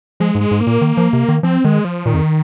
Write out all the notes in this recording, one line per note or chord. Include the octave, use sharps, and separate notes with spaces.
F3 G#3
G#2
G#3
G#2
A#3
A#2
D#3
F3
C3
D#3
F3 C4
D#3 G#3
F3
A#2 D#3
F2